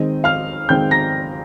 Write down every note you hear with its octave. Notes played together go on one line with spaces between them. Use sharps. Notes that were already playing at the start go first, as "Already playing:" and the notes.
Already playing: D#3 G#3 C4 D#5
F5 F6
D#3 G#3 C4 G5 G6
A#5 A#6